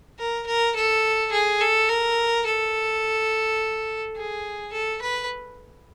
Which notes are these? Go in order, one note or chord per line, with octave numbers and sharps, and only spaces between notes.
A#4
A#4
A4
G#4
A4
A#4
A4
G#4
A4
B4